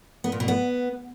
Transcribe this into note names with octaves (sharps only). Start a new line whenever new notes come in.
B3
A#2
B2
B3